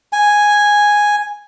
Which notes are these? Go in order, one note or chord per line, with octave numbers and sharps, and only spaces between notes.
G#5